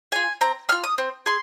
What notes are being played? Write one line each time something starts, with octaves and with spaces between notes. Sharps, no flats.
F4 G#4 G#5
C4 A#5
F4 G#4 F6
D#6
C4
G#4 C6